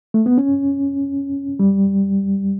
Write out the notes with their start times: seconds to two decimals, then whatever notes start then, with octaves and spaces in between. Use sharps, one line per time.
0.14 A3
0.26 B3
0.38 C#4
1.60 G3